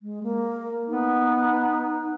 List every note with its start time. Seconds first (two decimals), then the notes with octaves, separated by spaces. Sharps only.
0.02 G#3
0.23 A#3
0.88 B3 D#4